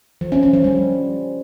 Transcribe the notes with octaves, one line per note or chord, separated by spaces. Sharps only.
F3
C#4
C#4
F3
G3